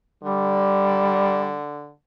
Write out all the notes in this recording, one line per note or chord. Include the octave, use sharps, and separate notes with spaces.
D3 G3